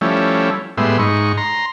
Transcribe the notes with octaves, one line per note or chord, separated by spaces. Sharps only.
F3 G3 A3 C#4 E4
A2 G3 G#3 B3 E5 C6
G#2 D#4 C#6
A#5 C6